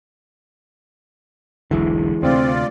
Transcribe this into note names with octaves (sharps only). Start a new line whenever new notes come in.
E1 B1 D3 E3 G#3
D2 C3 C4 F4 D5